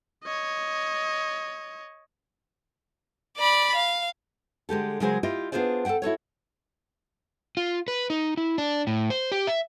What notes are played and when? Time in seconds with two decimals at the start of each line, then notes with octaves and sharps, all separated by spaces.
0.24 C#5 D#5
3.37 D5 B5
3.75 F5
4.69 D3 G#3 G4 A4
5.00 C#3 F#3 G#3 G#4 A#4 C5
5.23 E4 F4 G4 D#5
5.52 B3 D4 F4 G#4 C5 D5
5.85 A4 C5 E5 F#5 G5
6.02 E4 F#4 A4 C#5
7.57 F4
7.88 B4
8.10 D#4
8.37 E4
8.58 D4
8.87 A2
9.10 C5
9.32 G4
9.47 E5